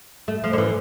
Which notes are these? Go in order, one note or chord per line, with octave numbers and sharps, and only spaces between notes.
A3
F3
D3
E3